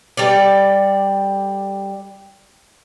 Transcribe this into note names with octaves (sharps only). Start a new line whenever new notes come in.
G3 A4 D5